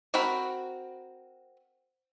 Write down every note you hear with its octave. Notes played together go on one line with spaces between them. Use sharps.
C4 F#4 A#4 F#5 B5